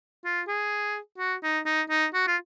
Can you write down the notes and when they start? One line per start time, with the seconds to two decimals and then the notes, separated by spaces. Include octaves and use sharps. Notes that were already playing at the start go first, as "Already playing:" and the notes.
0.25 F4
0.48 G#4
1.18 F#4
1.43 D#4
1.66 D#4
1.90 D#4
2.14 F#4
2.27 F4